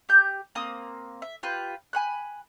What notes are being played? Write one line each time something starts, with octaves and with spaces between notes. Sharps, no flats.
G4 G6
A#3 C4 D#6
E5
F4 G4 B4
G#5 B5 F#6